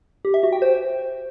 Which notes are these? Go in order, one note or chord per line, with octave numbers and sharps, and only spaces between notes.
G4
E5
F#4
G5
C5